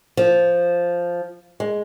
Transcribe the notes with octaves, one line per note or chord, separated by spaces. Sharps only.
F3
G#3